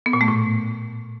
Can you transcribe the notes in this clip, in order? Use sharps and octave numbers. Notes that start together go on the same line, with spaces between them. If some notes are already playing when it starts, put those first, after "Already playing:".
B3
A#2
A3
A2